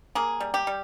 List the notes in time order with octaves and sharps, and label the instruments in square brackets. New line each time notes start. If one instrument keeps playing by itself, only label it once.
[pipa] A#3 G#4
G3
G4
G3